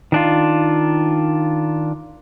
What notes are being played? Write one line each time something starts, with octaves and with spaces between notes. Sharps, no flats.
D#3 D4 F4